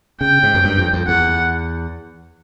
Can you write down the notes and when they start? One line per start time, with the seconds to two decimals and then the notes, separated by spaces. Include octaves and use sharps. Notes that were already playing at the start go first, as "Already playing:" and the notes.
0.21 C#3 G5
0.43 G#2
0.54 F#2
0.64 G2
0.78 F2
0.93 F2
1.07 E2 F#5